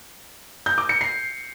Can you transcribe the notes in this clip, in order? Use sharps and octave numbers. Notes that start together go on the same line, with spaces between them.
G6
D6
C#7
C7